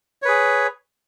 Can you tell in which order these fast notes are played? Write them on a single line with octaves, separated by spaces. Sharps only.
C#5 B4 G#4